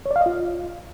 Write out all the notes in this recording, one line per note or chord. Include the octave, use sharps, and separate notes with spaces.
C#5
D5
F5
D#5
F4